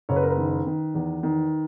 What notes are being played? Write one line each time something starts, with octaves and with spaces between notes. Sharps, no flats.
F#1 C#5
B4
A#4
B4
D#3
D#3
E2
D#3